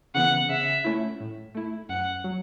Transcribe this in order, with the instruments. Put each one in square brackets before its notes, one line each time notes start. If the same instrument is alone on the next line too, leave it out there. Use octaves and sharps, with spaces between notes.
[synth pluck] C#3 E3 B3 [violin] F#5
[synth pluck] C#3 [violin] E5
[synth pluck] A3 C#4 E4
A2
A3 E4
[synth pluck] F#2 [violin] F#5
[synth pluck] F#3